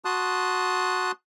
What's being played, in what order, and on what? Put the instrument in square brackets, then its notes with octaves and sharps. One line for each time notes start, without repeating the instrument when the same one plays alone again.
[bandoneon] F#4 A5 C6 D#6 F#6